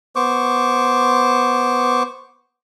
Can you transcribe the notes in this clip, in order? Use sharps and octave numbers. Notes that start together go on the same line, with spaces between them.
B3 C5 C#6 D6